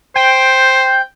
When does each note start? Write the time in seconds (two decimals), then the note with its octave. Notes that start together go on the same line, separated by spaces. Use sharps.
0.16 C5 G5